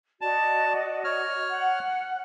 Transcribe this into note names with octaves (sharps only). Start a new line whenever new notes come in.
F#4 D5 D#5 A5
C#5 F6
F#5